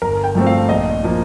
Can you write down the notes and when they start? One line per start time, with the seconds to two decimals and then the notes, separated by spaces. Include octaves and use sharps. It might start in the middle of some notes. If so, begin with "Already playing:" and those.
0.02 G1 A#4
0.24 G5
0.35 G2 F3 A3 C4
0.46 F5
0.69 A#1 D#5
1.03 A#2 F3 A#3